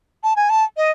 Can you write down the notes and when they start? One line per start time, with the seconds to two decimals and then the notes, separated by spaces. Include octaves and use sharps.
0.23 A5
0.36 G#5
0.50 A5
0.77 D#5